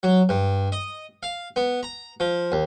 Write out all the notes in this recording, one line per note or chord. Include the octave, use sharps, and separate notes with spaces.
F#3
G2
D#5
F5
B3
A#5
F3
D#2